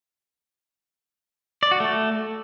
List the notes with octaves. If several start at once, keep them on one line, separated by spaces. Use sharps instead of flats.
D5
F#4
A3